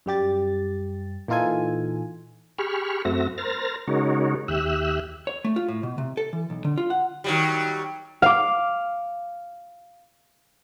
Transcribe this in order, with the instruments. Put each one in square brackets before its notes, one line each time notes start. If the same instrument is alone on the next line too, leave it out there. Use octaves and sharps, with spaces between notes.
[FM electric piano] F#2 G3 G4 A6
A#2 E3 D#4 F4 A4 G#5
[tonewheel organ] G4 G#4 B5 C#6 F6
F#2 A3 C4 F#4 E5 A#6
A#4 C5 F6 A6 A#6
C#3 G#3 D#4 F#4 A#4 C#5
D#2 G4 E5 E6 F#6
[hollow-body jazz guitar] C#5
A3
F4
A2
B2
C3
A4
E3
B1
D3
F4
F#5
[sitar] D#3 F#3 G3
[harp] F5 D6